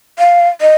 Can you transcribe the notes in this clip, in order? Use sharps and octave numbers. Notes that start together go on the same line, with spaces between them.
F5
D#5